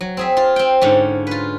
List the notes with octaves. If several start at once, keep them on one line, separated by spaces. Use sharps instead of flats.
F#3
C4 G#4 E5
F4
C4 G5
G#2 D3 C#4
F4 B4